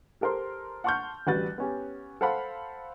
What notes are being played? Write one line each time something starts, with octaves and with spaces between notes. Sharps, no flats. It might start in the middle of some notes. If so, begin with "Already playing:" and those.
G4 A4 A#4 C5 C6
F#5 A5 C6 C#6 F6 G6
A1 G3 F#4 B4 F#6 A6
B3 C#4 G4
A4 C5 F5 F#5 B5